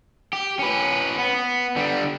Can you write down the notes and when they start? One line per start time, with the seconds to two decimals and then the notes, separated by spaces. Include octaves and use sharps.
0.33 G4
0.59 C#4 B4
1.19 B3
1.76 D3 G3